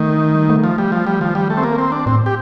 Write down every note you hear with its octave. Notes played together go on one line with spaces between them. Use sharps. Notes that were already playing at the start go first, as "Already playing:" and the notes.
Already playing: D#3 A3
G3
A3
F3
G3
F3
G3
D#3 F3
G3
A3
C4
A#3
C4
D4
A2 C4
G4